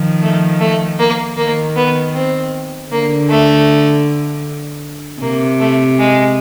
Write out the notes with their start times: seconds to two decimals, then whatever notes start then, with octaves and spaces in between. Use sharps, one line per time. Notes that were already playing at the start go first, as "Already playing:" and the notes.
Already playing: D#3 F3
0.22 A3
0.60 A3
0.99 A#3
1.37 D#3 A#3
1.76 B3
2.15 C4
2.92 D3 A#3
3.29 A3
5.22 C3 A#3
5.60 A3
5.99 G#3